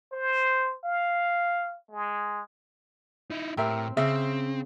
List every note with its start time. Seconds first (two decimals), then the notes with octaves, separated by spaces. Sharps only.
0.13 C5
0.84 F5
1.91 G#3
3.31 D#4 E4
3.57 A2 C4 G4 A#4 E5
3.97 C#3 C4 E5